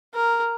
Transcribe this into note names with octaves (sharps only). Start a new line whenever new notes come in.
A#4